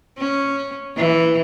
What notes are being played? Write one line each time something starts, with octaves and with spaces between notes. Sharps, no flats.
C#4
E3